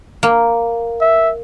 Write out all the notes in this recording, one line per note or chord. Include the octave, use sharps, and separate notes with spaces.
A#3
E5